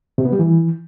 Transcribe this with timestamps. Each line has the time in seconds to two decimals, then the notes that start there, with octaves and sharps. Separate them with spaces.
0.18 C3
0.25 B3
0.32 G3
0.39 E3